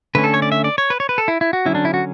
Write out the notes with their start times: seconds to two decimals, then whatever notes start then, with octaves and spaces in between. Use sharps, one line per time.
0.15 D3 A3 C#4 B4
0.24 A4
0.34 C#5
0.42 D5
0.52 E5
0.64 D5
0.78 C#5
0.90 B4
1.00 C#5
1.09 B4
1.18 A4
1.28 E4
1.41 E4
1.53 F#4
1.65 D3 F#3 C#4 E4
1.75 D4
1.85 E4
1.94 F#4